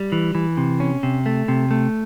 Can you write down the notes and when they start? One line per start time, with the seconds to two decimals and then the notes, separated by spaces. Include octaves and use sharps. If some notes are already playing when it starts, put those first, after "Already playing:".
Already playing: G3
0.12 E3
0.35 E3
0.57 C3
0.80 C#4
1.03 C3
1.26 A3
1.48 C3
1.71 A3